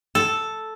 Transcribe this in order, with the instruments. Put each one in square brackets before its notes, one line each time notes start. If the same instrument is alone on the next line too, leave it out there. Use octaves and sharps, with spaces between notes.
[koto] A4